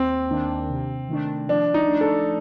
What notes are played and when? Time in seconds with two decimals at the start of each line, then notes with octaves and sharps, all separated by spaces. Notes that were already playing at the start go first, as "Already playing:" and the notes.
Already playing: D#2 C4
0.31 D#3 A#3 D4
0.70 C3
1.09 D#3 A3 D4
1.49 F3 D4
1.74 D#4
1.88 A3 D4
2.01 A4